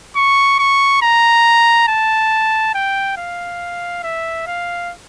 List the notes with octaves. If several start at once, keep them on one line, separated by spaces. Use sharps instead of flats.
C#6
C#6
A#5
A5
G5
F5
E5
F5